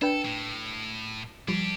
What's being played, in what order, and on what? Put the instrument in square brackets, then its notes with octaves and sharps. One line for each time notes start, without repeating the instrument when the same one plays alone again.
[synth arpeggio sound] D4 B4 G5 [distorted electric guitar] A4
[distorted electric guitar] A2
[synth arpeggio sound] F3 G3 [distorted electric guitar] D4 G4